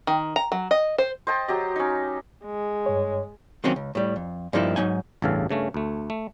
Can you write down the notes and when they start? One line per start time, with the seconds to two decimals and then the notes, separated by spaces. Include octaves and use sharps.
0.07 D#3
0.36 A#5
0.52 F#3
0.71 D#5
0.98 C5
1.27 C5 D#5 G5 A5
1.48 F#3 G4 D#5
1.76 C#4 D#4
2.46 G#3
2.86 G2 C#5
3.64 D#3 F#3 A#3 C4 C#4
3.76 C#2
3.95 A2 G3
4.16 F2
4.53 G2 F3 A#3 D#4 E4
4.76 G#2 F#3 D#4 G#5
5.22 A1 E2 G2 C#3 A4 F5
5.49 G2 C#3 A3 C#4
5.74 D2 A3
6.10 A3